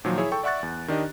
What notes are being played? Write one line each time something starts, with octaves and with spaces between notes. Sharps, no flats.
A#2 D#3 F3 F#3
E4 G#4 C#5 E5
A4 G5 C#6
D5 E5 F#5 C#6 F#6 A6
E2
D#3 D4 G4 D#5